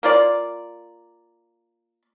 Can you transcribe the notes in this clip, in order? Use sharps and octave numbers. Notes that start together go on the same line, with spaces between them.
A#3 F4 D5